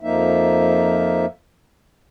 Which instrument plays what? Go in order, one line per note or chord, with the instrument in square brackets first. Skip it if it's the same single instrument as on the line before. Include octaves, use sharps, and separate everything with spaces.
[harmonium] F2 F3 A#3 D#4 E5